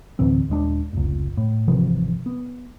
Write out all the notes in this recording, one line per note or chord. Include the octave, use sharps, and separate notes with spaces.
D2 A2 E3 C4
D#1 G#3 D4
F1 C#2
A2
G#1 C3 E3 F3
B3